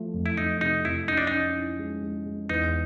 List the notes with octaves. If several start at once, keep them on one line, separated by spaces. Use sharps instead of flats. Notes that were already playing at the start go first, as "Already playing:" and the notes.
Already playing: F3 A3
F2
E4
F2 D#4
C3 D#4
F2 E4
C#4 D#4
D4
C#4 D#4
E4
G#3
G#3
G#3
E2 D#4